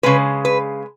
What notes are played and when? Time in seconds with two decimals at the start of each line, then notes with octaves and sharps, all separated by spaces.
0.03 C#3 G#3 B4
0.45 B4